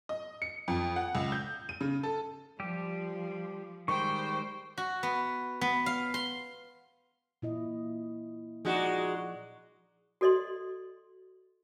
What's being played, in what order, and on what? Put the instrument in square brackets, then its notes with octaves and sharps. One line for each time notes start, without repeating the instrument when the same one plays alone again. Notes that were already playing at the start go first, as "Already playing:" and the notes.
[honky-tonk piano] D#5
C#7
F2
F#5
C#2
G6
D#7
C#3
A4
[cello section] F3 [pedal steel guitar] G3 G4
[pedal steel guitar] D#3 G3 G#3 [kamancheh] C5 G5 [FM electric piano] C#6
[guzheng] F#4
B3
B3
F5
C6
[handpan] A#2 E4 D#5
[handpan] F3 D5 [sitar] G#3 D#4 F#4
[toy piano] F#4 A4 D5 D#5 C6